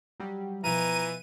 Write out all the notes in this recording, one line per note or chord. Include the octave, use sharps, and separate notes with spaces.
F#3 G3
B2 E3 F3 A#5 D#7